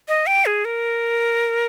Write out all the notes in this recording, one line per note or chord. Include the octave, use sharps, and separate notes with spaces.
D#5
G5
G#4
A#4